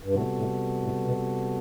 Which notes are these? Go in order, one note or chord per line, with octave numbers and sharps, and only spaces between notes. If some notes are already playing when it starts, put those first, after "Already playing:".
G2
A2 C3 G3 B3 F#4 A4
A2
A2
B2